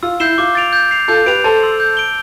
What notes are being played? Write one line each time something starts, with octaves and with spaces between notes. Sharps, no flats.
F4 E6
E4 G6 C7 E7 G7
F4 D6
A6 D7 F7
G6
C7 F7
F4 A4 G6
G4 B4 D7 F7
A4 C5 A5
C6 E6
G6
D7 G7